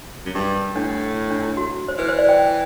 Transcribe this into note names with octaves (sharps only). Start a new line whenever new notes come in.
F#2
G2
A2 D4
D4
E4
F#4
C5
E3 B4
C5
D5
G5